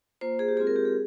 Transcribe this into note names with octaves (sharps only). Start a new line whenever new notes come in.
A#3 F4 C5
G#4
G4
G#3 C4 F4 G#4
A#4
G4
G#4